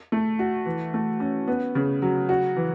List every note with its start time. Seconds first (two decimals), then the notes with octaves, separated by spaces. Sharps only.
0.12 A3
0.39 F#4
0.66 E3
0.94 A3
1.20 C#4
1.48 B3
1.75 C#3
2.02 F#3
2.29 F#4
2.56 E3